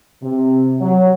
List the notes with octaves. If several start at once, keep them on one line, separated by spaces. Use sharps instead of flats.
C3
F#3